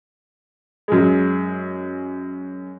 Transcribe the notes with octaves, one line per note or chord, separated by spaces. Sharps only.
F#2 G#3